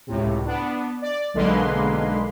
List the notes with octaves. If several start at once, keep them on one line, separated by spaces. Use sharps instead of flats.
C#2 A2 C3
B3 D4
D5
B1 D3 G#3 A#3 B4 C6